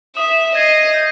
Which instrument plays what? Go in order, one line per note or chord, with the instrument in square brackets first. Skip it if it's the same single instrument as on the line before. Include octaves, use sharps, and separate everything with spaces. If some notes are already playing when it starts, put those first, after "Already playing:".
[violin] E5 [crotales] D#6
[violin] D#5 [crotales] G#6 C7
[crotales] G6